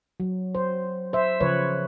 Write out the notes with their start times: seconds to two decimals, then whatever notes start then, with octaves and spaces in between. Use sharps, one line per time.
0.20 F#3
0.55 C5
1.13 C5 E5
1.40 C#3 F3 B4 C#5